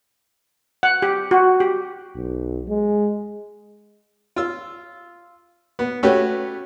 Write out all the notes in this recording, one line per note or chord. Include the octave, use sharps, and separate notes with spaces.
F#5
G4
F#4
G4
B1
G#3
F4 E6
B3
A3 C#4 F#4 G4 B4